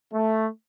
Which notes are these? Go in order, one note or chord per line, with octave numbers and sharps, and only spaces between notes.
A3